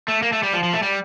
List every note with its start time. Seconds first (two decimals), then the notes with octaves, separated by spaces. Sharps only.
0.08 A3
0.22 A#3
0.32 A3
0.43 G3
0.53 F3
0.64 F3
0.73 A3
0.83 G3